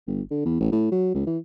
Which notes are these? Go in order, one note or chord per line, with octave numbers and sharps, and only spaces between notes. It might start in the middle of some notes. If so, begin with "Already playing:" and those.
G1
D3
E2
A1
A2
F#3
C#2
E3